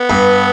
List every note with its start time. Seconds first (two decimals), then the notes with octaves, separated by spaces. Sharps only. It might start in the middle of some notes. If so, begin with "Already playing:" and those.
Already playing: B3
0.10 G2